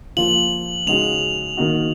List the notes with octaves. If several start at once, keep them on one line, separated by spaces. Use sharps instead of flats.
F3 A#3 F4 F#7
C#3 G#3 D#4 F#4 F7
D#3 A#3 D#4 F#4